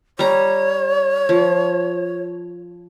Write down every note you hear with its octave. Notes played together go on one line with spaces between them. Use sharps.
G3 C#5 A#5
F3